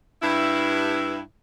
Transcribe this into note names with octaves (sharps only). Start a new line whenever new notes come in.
G2 E4